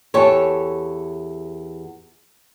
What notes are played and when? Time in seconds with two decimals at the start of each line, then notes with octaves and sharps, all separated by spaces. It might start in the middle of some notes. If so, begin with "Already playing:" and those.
0.14 E2 G4 A4 C#5